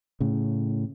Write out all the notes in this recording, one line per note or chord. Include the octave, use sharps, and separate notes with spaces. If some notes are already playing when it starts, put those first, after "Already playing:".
A2 C#3